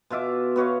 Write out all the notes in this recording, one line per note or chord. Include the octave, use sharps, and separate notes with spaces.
B2 F4 E5 D6
B3 F#4 C#5 F5